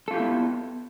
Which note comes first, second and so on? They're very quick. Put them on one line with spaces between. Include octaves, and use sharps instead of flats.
A4 F4 G4 E4 B3